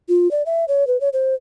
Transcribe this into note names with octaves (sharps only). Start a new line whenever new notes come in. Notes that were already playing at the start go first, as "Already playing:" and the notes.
F4
D5
E5
C#5
B4
C#5
C5